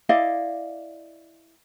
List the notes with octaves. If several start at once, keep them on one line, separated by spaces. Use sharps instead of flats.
E4 D5 D#5 F5